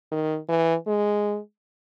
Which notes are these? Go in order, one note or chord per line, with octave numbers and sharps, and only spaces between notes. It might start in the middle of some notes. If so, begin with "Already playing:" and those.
D#3
E3
G#3